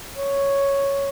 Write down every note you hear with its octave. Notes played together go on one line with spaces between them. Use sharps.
C#5